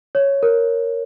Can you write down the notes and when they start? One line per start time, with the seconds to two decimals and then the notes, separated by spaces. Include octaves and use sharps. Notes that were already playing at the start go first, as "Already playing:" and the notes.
0.15 C#5
0.43 A#4